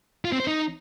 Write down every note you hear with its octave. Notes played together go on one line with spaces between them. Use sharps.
F4
C4
C5
D#4